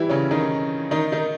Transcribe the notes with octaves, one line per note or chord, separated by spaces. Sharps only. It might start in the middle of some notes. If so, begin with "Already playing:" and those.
Already playing: E3 G3 E4 G4
C#3 C#4
D#3 D#4
D#3 D#4
D#3 D#4